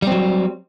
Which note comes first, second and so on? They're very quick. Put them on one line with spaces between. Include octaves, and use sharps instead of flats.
G3 C4 F#3